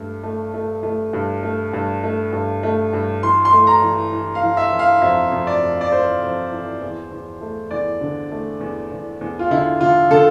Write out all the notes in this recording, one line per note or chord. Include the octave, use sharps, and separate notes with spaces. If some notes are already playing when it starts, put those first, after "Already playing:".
Already playing: G2 A3
A3
A3
A3
G2
A3
G2
A3
G2
A3
G2
E3 C6
C6
A3
A#5
E3
E3
F5
E3
E5
E3
F5
F2 E5
F2
D5
F2
D5
E3 C5
F2
E3
E2
E2
A3
E2 D5
D3
A3
E2
E2
E2
F4
D3 E4
D3 F4
D3 A4